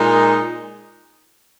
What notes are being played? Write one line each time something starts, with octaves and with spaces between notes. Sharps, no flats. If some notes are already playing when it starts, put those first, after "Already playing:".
Already playing: A#2 G#3 D#4